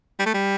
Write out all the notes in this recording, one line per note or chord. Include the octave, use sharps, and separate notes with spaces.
G3
A3
G3